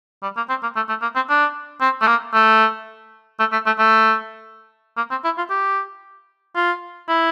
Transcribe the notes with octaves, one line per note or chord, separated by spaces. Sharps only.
G3
A#3
C4
A#3
A3
A3
A#3
C4
D4
C4
A3
A#3
A3
A3
A3
A3
A3
A#3
C4
E4
F4
G4
F4
E4